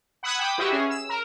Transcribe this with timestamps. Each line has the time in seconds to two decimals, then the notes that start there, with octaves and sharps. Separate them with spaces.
0.23 F#5 B5 D#6 E6 F#6 G#6
0.39 G5 B5 D6 D#6
0.58 E4 F#4 G4 B4 D#5 E5
0.71 C#4 G#4
0.90 E6
1.09 A#4